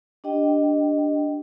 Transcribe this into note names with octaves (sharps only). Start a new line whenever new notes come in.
D4 G4 D#5 G5